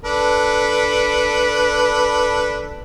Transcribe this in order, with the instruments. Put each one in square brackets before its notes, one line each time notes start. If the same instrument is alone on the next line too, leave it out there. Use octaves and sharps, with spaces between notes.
[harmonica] D4 A4 B4